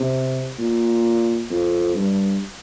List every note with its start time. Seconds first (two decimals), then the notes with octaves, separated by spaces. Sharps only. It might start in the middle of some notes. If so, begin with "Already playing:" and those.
Already playing: C3
0.59 A#2
1.50 F2
1.96 G2